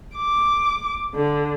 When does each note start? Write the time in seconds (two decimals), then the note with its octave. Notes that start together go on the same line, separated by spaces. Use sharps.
0.16 D6
1.15 D3